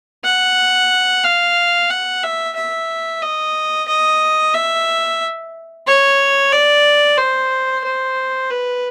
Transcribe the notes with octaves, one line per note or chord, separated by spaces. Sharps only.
F#5
F5
F#5
E5
E5
D#5
D#5
E5
C#5
D5
C5
C5
B4